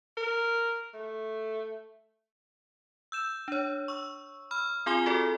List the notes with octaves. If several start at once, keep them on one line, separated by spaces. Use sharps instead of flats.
A#4
A3
E6 G6 E7
D4 C#5
C#6 E6
B5 E6 F6
C4 F4 G#4 G#5 C6 G7
F#4 A4 D5